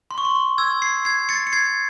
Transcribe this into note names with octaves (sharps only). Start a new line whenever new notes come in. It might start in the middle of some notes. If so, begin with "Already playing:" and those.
C6
C#6
C6
C6
E6 G#6
G#6 C7
G#6 C7
A6 C#7
C#7
G#6 C7